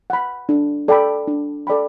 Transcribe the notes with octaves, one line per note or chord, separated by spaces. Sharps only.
F#5 B5
D4
A4 D5 G5 B5
D4
A4 D5 G5 B5